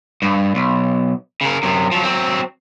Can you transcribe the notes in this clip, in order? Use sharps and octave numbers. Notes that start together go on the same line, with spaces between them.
G2
B1
C#3 A#4
F#2 C3
F3 F#3
F#3 C4